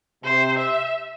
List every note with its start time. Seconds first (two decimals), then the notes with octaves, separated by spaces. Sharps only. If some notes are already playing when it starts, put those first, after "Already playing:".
0.23 C3 C5
0.59 E5